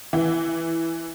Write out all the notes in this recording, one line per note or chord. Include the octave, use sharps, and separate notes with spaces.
E3